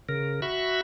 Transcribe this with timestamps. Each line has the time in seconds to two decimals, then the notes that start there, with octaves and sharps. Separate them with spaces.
0.09 C#3 A#4
0.42 F#4 E5 B5 C#6